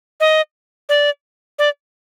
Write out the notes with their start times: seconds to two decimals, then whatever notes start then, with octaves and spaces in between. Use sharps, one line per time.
0.20 D#5
0.89 D5
1.59 D5